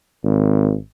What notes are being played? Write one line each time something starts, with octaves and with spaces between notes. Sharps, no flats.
G#1